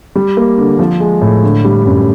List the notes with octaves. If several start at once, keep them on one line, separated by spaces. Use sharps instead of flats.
G3
A#3
D3
F3
G#3
A2
D3
G3
F#2